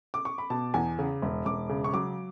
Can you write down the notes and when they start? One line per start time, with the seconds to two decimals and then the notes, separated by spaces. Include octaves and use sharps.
0.14 D6
0.25 C#6
0.38 B5
0.50 B2 A5
0.74 E2 G#5
0.99 C#3
1.22 E1
1.45 E1 D6
1.69 C#3
1.84 C#6
1.93 F#3 D6